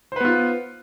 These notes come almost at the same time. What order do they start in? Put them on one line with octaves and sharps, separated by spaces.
C5 B4 B3 F4